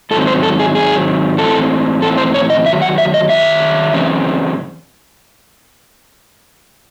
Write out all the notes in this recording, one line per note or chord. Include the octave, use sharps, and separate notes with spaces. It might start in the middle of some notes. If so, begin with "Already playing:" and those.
G#2 D#3 F#3 C4 A4
C5
A4
G#4
G#2 D#3 F#3 C4 G#4
A2 E3 C4 A4
A2 E3 C4 A4
C5
C#5
D#5
F#2 D#3 F#3 E5
F#5
E5
D#5
F#2 D#3 F#3 E5
F#2 C#3 E3 C4